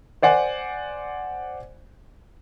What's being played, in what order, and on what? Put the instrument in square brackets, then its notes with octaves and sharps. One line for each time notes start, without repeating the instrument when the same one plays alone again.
[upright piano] C5 D5 F#5 G#5